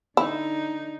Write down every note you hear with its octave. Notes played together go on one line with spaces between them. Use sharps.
D3 D#4 E4